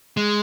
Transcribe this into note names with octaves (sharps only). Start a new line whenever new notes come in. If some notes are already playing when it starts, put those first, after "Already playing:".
G#3